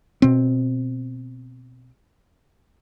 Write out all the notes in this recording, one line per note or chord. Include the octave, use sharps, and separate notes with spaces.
B2 C4